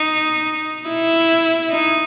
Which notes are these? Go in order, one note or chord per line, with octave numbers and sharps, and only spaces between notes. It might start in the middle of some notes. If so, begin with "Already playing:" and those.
Already playing: D#4
E4
D#4